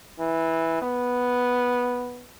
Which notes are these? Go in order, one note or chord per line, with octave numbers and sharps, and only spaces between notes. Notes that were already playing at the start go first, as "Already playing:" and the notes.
E3
B3